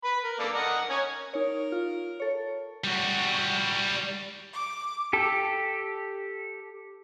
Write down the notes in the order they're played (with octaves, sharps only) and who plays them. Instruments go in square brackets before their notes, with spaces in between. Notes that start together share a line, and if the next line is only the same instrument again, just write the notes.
[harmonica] B4 B5
A#4
A#3 A4 D5
A#4 D#5 F#5
C#4 C#5 G#5
[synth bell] D#4 C#5 [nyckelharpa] A#4
[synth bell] F4
A4 C#5
[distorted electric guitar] G3 F#4
[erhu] D6
[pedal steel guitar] G4 A4